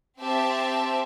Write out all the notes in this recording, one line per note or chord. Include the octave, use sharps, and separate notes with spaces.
C4 G4 C5 E5 A5